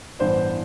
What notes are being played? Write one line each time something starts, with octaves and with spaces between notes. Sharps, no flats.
A1 G2 E3 B3 D4 C5